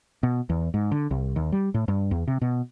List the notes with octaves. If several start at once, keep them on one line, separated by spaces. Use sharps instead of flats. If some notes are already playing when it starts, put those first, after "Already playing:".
B2
E2
G#2
D3
C2
D#2
G3
A2
G2
E2
C3
B2